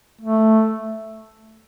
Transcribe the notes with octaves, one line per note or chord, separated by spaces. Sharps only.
A3